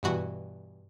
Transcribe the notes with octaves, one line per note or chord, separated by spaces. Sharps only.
G2 B2 E3 F#4